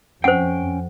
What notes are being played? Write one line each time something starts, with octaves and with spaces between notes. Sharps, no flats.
F2 C#4 C5 F#5 G5